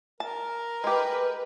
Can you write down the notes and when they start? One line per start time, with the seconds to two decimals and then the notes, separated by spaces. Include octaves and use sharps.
0.20 A#4 A5
0.84 G#3 G4 B4